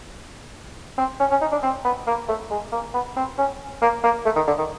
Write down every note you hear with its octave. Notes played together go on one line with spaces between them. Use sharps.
C4
C#4
C#4
D#4
D4
C4
B3
A#3
A3
G#3
A#3
B3
C4
C#4
A#3
A#3
A3
D#3
D3
D#3